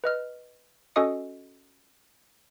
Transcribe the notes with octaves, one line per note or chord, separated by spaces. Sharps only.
B4 D#5 F6
C#4 F#4 A4 D#5 D#6 C#7